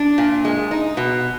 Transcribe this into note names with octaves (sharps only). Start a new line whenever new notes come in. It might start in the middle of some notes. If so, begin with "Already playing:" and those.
Already playing: D4
A#2
G#3
D#4
B2